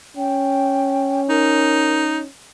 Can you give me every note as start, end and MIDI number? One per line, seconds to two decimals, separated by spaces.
0.17 2.28 61
0.17 1.22 79
1.29 2.21 63
1.29 2.04 70